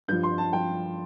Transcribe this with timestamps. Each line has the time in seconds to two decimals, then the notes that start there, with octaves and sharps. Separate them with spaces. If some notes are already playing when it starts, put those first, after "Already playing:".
0.08 G2 F3 G6
0.23 C6
0.38 A5
0.53 F3 G5